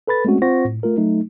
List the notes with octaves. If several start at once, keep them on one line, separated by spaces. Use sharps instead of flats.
A4 B4 B5 A6
G#3 A3 C4 C#4 F#4
C4 F4 C5 F#5 C#6 A#6
A2
A3 F4 A#4
F#3 A3 D#4